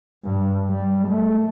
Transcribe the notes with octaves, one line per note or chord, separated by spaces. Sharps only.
G2
G3
A3